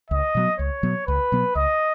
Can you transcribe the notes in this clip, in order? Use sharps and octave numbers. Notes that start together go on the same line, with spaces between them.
C#2 D#5
B2 F#3 B3
C#2 C#5
B2 F#3 B3
C#2 B4
B2 F#3 B3
C#2 D#5